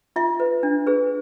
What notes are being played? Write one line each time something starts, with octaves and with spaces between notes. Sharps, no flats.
F4 E5
B4
D4
G#4 B4